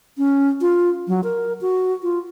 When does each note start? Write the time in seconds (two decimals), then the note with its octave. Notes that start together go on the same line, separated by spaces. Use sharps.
0.18 C#4
0.61 F4
1.08 F#3
1.24 A#4
1.61 F#4
2.03 F4